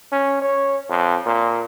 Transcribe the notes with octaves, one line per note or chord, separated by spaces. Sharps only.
C#4
C#5
F2
A#2